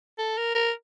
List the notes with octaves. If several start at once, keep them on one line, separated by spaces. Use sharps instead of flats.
A4
A#4
A#4